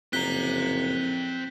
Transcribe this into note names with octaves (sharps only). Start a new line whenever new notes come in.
F#1 F2 C4 A#5 F#6 B6 G7